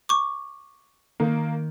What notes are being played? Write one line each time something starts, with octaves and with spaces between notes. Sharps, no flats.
C#6 D6
D#3 A#3 G6 D7